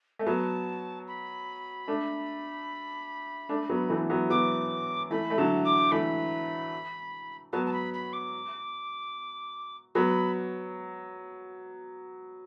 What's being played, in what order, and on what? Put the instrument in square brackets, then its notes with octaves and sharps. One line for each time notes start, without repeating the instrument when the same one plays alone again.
[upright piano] A3
[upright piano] F#3 B3 [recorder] A5
[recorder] B5
[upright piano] A3 D4
A3 D4
F#3 B3
E3 A3
F#3 B3
[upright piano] F#3 B3 [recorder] D6
[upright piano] E3 A3 [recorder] B5
[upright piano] A3
[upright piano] D3 F#3 [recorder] A5
[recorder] D6
[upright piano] E3 A3 [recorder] B5
[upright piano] F#3 B3 [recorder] A5
[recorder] A5
B5
B5
D6
[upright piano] F#3 B3 [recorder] B5